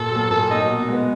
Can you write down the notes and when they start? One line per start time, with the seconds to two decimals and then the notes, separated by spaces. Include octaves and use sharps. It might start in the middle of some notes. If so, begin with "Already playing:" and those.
Already playing: A#2 A4
0.11 F#3 A#3
0.31 A#2 A4
0.50 F#3 A#3 D#4
0.69 B2
0.88 G#3 B3